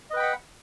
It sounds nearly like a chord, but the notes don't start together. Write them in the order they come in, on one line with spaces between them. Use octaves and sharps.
D#5 B4 G5 B5 F#5